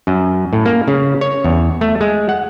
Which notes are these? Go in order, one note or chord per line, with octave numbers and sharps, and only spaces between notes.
F#2
A2
A#3
C#3
C#5
E2
A3
G#3
F#5